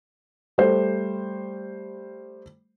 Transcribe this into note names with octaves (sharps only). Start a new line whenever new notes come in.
G3 A3 C5